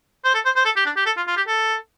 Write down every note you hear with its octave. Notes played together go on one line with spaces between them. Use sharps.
C5
A4
C5
C5
A4
G4
D4
G4
A4
F4
F4
G4
A4